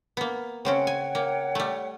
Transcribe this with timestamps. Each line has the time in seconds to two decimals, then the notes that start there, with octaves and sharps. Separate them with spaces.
0.17 A#3 B3
0.65 C#3 C4 C#4 C#5 F#5 G5
0.87 G#5
1.15 A#3
1.55 G3 A3